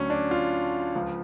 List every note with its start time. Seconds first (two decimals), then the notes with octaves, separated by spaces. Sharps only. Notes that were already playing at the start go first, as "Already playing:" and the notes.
Already playing: D2 D3 F#3 C#4
0.10 D4
0.31 F4
0.95 C#2 C#3 F3